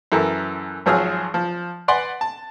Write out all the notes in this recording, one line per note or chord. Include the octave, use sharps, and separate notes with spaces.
F#2 E3 A4 A#4
G#1 F3 F#3 G#4 E6 F6
F3
B4 D5 F#5 G#5 C6
A5